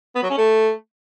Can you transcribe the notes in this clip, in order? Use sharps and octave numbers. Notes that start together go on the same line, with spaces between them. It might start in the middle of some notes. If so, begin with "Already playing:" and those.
B3
F#3
C#4
A3